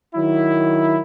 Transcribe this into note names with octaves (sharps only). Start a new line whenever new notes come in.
D#3 F#3 E4